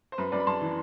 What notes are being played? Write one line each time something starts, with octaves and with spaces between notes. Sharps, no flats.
C5
F#2 B4
F#2 B4 D5
B5
F#2 A5 C6
E3